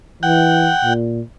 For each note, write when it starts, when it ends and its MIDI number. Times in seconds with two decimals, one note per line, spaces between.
0.23 0.70 52
0.23 0.94 78
0.23 0.94 79
0.85 1.21 46